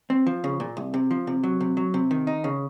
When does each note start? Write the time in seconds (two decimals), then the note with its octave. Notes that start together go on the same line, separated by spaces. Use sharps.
0.10 C4
0.27 F3
0.44 C#3
0.60 A#2
0.77 C2
0.94 C3
1.11 F3
1.27 C3
1.43 F#3
1.61 C3
1.77 F#3
1.94 C3
2.11 D#3
2.27 D#4
2.44 C#3